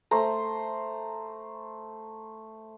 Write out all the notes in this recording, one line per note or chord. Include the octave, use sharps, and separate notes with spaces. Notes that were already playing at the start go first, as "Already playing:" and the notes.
A3 C5 A#5